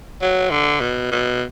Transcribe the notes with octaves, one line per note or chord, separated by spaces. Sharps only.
F#3
D3
B2
B2